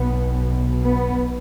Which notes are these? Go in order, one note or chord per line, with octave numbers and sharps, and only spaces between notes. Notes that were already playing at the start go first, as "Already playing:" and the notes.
Already playing: B1 B2 B3
B3